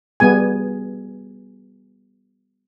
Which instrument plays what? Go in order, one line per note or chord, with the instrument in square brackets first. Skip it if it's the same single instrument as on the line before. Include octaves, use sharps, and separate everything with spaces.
[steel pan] G3 B3 G#4 G#5